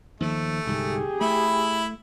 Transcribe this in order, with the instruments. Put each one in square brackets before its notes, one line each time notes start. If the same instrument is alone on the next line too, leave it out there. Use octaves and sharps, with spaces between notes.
[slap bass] D#2 F3 [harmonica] A3
[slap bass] C2 G#2 D3 [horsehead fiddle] G4 G#4
[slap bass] A3 [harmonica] E4 B5